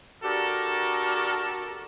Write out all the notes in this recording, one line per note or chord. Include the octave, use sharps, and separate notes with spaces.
D4 F#4 G4 A4 A#4